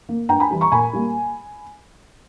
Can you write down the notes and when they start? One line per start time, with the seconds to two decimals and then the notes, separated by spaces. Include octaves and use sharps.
0.09 A#3
0.29 G2 G5 A#5
0.40 G#5 B5
0.51 E3 G3
0.61 A#5 C#6
0.72 A#2 G#5 B5
0.93 G3 A#3